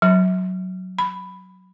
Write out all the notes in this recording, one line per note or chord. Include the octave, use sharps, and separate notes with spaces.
F#3
B5